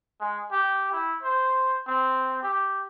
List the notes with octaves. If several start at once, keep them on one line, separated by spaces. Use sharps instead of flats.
G#3
G4
E4
C5
C4
G4